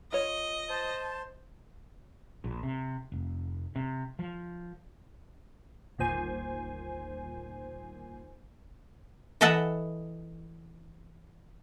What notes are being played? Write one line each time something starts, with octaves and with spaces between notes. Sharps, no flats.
F4 C#5 D#5
C5 A5
A#1
C3
F1
C3
F3
G1 D#2 A#2 C5 G#5
E3 A4 D#5 E5 F#5 A5